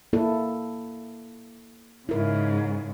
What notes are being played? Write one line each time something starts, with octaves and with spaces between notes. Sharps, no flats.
A#3 E4 A4
G#2 C#3 E4 A#4